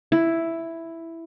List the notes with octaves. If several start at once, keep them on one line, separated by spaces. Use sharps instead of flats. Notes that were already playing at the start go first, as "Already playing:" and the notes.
E4